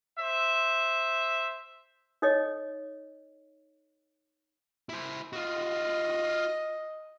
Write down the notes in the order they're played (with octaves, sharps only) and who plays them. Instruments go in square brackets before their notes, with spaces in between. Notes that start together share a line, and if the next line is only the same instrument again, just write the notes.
[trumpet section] C5 E5
[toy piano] D#4 A4 C#5 D#5
[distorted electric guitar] E4 C5
[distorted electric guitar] F4 F#4 [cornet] D#5